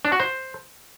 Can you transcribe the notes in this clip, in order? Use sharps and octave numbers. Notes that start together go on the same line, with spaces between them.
D4
F#4
C5